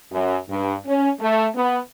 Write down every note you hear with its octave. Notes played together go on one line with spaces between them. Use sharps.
F#2
G2
C#4
A3
B3